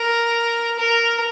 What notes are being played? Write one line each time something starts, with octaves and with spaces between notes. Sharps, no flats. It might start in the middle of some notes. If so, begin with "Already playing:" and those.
Already playing: A#4
A#4